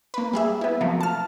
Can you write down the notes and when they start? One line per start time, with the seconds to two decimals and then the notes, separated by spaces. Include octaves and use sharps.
0.14 A#3 B4
0.33 G3 G#4 E5
0.61 B3 E4
0.81 C3 F3 F#3 A3 A#3
1.01 A5 F6